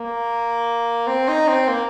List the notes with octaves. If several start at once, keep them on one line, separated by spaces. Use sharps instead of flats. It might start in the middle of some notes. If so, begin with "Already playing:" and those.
Already playing: A#3
C4
D#4
C4
A#3